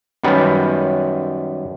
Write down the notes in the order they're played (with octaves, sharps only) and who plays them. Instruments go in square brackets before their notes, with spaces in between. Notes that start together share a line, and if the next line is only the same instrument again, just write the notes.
[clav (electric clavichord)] F#2 D#3 G3 B3